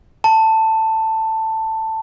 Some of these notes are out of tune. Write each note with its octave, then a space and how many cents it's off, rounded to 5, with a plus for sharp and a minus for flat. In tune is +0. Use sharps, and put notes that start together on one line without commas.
A5 +10